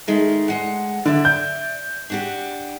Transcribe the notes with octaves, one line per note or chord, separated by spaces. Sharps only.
D#3 G#3 A3
D2 G#3 F#5
D3 D5 E5
G6
D4 F#4 G4